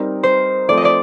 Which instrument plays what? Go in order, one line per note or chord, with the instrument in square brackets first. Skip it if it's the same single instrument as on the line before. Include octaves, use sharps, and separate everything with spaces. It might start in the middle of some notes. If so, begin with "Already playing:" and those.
Already playing: [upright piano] G3 C4 D#4 A#4
[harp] C5
[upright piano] F3 A3 C4 [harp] D5
[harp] D#5
D5